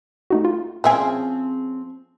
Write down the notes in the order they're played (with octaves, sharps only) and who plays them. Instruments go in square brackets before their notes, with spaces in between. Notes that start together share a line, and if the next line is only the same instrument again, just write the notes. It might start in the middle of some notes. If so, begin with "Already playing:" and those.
[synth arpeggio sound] A3 D#4 F#4
F4
[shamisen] F3 E5 G#5 [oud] C4 C#4 G#4